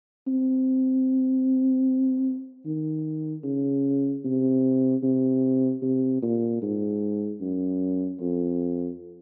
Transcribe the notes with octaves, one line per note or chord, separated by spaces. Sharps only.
C4
D#3
C#3
C3
C3
C3
A#2
G#2
F#2
F2